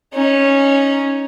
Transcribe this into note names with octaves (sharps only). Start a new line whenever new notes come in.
C#4 D#4